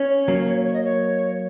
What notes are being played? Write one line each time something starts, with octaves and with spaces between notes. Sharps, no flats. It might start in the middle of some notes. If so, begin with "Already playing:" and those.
Already playing: C#4 C#5
F#3 A#3
C#5
D#5
C#5